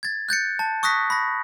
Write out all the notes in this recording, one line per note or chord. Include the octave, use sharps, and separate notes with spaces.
G#6 A6
F#6 G6 A6 C#7
A5
C#6 D#6 F#6 A#6 B6
B5 A#6